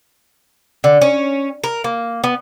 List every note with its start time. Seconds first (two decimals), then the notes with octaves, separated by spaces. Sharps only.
0.84 D3
1.01 C#4
1.64 A#4
1.84 A#3
2.24 B3